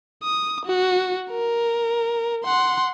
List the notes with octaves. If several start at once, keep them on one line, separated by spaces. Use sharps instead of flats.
D#6
F#4
A#4
F#5 C6